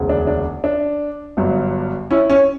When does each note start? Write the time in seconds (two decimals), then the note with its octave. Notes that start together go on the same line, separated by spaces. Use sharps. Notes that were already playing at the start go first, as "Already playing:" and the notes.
Already playing: E1 D2 C#3
0.09 D4
0.27 D4
0.64 D4
1.37 G1 G2 F#3
2.11 C#4 E4
2.30 C#4